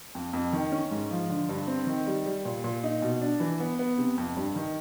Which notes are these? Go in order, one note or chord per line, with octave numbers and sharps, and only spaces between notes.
F2
F2
D#3
C#4
G#2
F3
D3
G2
C4
D#3
G3
G3
A#2
A#2
D#4
B2
D4
E3
B3
B3
C3
F2
G2
D#3